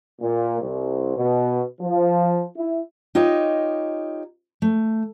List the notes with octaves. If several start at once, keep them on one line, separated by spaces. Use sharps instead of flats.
A#2
C2
B2
F3
E4
D#4 F4 G4 C#5 D#5
A3